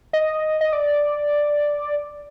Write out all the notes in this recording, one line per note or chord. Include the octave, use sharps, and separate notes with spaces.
D#5
D#5
D5